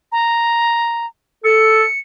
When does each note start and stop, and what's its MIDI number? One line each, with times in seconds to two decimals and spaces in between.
0.12 1.06 82
1.45 1.84 69
1.45 1.99 97